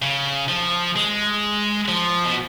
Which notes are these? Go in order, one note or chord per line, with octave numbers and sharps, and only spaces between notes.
C#3
F3
G#3
F3
B2